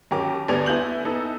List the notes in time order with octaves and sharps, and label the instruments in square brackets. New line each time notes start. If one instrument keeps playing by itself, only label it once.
[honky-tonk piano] D#2 F#3 C#4 G4 A#4 D6
D2 G3 B3 D5 G#6 F7
B3 E4 G#5 G6 F#7
B3 D#4 A4